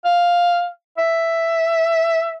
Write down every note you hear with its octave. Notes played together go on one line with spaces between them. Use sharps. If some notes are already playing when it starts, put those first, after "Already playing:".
F5
E5